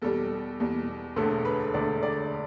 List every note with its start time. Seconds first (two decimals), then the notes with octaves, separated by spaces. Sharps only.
0.02 E2 B2 G3 A4
0.60 E2 B2 G3
1.16 E1 D2 D3 A3 A4
1.45 B4
1.74 E1 D2 D3 A3 D5
2.03 D5